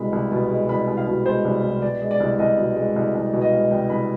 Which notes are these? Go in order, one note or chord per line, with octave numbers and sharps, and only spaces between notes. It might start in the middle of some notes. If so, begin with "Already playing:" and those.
Already playing: C2 B2 G#3 B5
C2
B2
G#3
C2 B5
C2
F5
B2
G#3 C5
C2
C2
B2 D5
G#3
D5
C2
D5
C2 D#5
B2
G#3
C2
C2
B2
D#5
G#3 F5
C2 G5
C2 B5